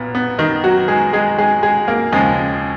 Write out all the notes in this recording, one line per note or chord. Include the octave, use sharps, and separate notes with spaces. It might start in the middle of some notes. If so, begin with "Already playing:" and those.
Already playing: B1 A#2 B3
B3
D#3 D#4
F#3 F#4
G#3 G#4
G#3 G#4
G#3 G#4
G#3 G#4
A#3 A#4
D#2 C#3 F3 G#3 G#4